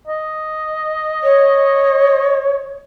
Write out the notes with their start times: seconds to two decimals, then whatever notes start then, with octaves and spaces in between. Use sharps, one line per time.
0.07 D#5
1.23 C#5